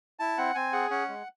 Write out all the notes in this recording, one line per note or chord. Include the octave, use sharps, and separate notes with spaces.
E4 A5
C4 F#5
C4 G#5
G#4 F#5
C#4 F#5
G#3